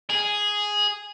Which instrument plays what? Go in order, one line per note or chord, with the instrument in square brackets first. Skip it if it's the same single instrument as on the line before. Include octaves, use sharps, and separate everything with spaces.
[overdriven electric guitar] G#4